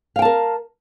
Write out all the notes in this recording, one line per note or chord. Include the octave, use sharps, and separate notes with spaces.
A#4 F5 G5 A5